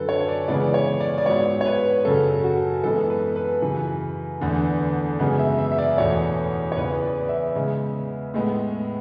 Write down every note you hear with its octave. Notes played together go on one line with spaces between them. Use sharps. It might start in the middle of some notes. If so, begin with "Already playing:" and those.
Already playing: F#2 D3 F#3 A4 B4
C#5
D5
C#3 E3 G#3 B3 D5
C#5
D5
D5
G#2 F#3 B3 C#5
C#5
B4
F#2 C#3 F#3 A4
F#4
F#2 E3 G#3 B3 A4
B4
B4
F#2 C#3 E3
E2 D3 A3
F#2 C#3 G#3 B3
E5
E5
E5
D5
E2 B2 A3 C#5
C#5
E2 C#3 E3 B3 B4
D5
E5
C#3 G#3 B3
A2 G#3 B3